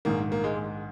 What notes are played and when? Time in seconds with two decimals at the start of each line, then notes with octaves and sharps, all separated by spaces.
0.05 A#1 G#2 D#3 A#3
0.32 A#3
0.44 G#3